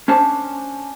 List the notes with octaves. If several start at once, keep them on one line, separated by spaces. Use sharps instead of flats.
C#4 D4 C5 A5